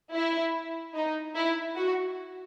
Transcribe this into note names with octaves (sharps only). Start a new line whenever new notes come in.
E4
D#4
E4
F#4